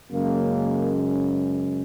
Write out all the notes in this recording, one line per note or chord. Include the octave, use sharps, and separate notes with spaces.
F#2 C#3 G#3 A#3